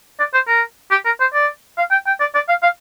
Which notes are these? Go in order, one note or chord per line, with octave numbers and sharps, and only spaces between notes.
D5
C5
A#4
G4
A#4
C5
D5
F5
G5
G5
D5
D5
F5
F5